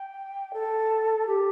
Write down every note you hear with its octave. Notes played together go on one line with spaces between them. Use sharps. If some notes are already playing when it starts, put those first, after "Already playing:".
Already playing: G5
A4
G4